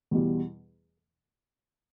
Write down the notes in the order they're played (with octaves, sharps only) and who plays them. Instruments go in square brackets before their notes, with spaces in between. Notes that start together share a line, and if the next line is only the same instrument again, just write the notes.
[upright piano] E2 B2 G3